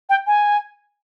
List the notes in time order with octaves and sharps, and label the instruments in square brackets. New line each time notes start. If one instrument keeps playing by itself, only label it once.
[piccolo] G5
G#5